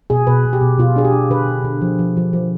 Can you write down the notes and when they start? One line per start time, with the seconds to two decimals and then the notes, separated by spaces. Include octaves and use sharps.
0.10 B2 G#4
0.27 B2 B4
0.45 B2
0.53 G4
0.61 B2
0.79 B2 F4
0.96 D4 G#4
1.05 G4
1.13 D4
1.30 D3 B4
1.48 D3
1.64 D3
1.82 F3
1.99 F3
2.17 F3
2.33 F3